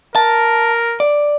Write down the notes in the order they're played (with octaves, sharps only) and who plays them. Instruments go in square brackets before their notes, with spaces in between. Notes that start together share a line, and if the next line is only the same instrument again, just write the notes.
[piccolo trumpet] A#4 [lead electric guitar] A5
[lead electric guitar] D5